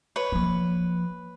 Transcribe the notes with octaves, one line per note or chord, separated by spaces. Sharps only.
B4 C#5
F3 A#3